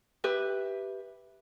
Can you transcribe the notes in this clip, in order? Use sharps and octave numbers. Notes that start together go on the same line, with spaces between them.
G4 B4 E5